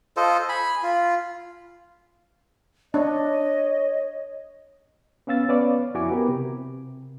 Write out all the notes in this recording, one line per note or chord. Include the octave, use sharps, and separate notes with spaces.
F4 A4 C5 D#5
G#5 B5
F4
D4 C#5 D#5
B3 C#4 F5 E6 A6
B3 C#4 B4 C#5 D5 F5
F2 E4 F#4 G#5 D6
B3 G4 A#4 B4
C3